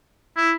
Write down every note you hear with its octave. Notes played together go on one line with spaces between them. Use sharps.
E4